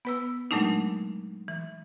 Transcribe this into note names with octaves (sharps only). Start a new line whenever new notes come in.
B3 B4 E6
A#2 F#3 G#3 A3 D4 D#4
E3